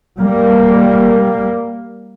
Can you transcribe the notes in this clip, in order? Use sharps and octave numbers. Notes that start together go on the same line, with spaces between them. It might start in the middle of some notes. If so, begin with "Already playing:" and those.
G3 A#3